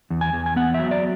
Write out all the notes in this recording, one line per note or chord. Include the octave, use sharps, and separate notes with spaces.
E2
G#5
E2
G#5
B3 F#5
E5
F#3
D5